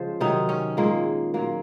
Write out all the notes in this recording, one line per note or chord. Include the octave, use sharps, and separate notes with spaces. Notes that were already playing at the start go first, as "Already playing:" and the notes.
Already playing: C#3 F3 G#3 C5
C3 D#3 F#3 D#4
C#4
A#2 G#3 A#3
A#2 F#3 A#3